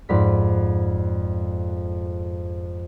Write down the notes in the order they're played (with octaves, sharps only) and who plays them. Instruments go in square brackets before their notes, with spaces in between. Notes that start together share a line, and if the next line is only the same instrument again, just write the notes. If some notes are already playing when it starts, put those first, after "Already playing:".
[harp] F2 G#2 D5 B5 B6